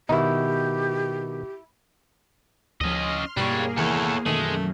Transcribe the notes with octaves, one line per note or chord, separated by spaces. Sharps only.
B2 D#3 D#4 E4 F#4 G4
D2 F3 C#4 D#5 C6 F6
G2 B2 G3 A#3 D4 G#4 C#5
E2 C3 D#3 E3 A4 C#5
F#2 B2 D#3 E3 G#3 A3